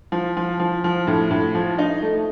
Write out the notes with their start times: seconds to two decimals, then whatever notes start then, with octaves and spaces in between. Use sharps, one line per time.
0.12 F3
0.37 F3
0.60 F3
0.84 F3
1.07 A2
1.31 A2
1.55 F3
1.78 D#4
2.02 A3